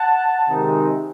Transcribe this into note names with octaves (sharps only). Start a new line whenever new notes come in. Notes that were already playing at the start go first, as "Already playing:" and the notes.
Already playing: F#5 A5
C3 D#3 G#3 C4 D#4